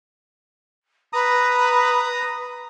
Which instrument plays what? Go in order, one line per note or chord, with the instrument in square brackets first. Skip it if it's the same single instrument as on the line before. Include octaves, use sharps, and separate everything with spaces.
[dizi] B4 [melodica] A#5 D#6